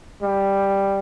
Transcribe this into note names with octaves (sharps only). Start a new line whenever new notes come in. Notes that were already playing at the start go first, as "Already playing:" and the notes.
G3